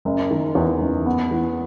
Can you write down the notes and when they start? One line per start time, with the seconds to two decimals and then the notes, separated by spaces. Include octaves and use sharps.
0.05 F#1
0.30 D#3
0.55 E2
0.81 F#1
1.06 B3
1.31 E3